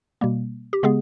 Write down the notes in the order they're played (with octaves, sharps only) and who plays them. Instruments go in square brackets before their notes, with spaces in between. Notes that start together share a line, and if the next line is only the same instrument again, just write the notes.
[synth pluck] B2 G3 A#3
G4
C#3 G#3 B3 G#4